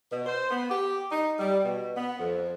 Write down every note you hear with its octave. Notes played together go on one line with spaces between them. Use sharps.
B2
C5
B3
G4
D#4
G3
B2
B3
F2